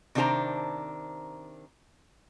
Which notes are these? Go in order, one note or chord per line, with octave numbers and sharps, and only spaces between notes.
C3 D#3 D4 G4 C5 A#5